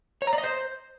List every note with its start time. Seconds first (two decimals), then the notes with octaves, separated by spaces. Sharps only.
0.22 C#5
0.27 A#5
0.33 D5
0.38 D#5
0.43 C5